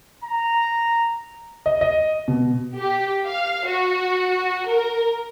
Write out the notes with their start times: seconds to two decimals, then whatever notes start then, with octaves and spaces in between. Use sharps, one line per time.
0.24 A#5
1.66 D#5
1.81 D#5
2.28 B2
2.80 G4
3.27 F5
3.68 F#4
4.68 A#4